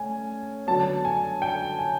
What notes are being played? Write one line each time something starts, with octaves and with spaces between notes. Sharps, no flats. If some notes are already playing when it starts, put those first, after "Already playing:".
Already playing: A3 C#4 G#5
D3 F#3 B3 A5
G#5
G5
G#5